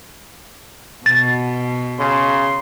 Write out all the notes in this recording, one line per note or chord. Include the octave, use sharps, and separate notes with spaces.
B2 A6
C#3 C6